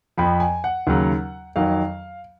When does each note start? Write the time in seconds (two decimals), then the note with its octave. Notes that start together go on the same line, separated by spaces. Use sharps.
0.17 F2 F3 B5
0.40 G#5
0.64 F#5
0.87 D#2 C#3 F#3
1.56 F2 D#3 F#3 F5